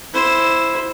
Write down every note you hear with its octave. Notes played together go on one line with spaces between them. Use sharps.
E4 C5